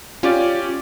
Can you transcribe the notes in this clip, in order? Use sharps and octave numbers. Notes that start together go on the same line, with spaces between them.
C#4 F4 G4 D5